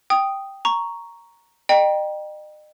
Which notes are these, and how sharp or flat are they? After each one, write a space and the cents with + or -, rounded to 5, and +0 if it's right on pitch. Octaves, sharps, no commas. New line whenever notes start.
G5 +0 D#6 +0
A#5 +0 C#6 +5
D#5 -40 G5 +0 A#5 +35